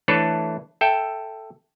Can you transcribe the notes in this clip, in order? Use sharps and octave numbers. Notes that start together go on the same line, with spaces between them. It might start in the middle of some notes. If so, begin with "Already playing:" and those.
E3 A3 D4 A4 B4 C#5
A4 E5 G5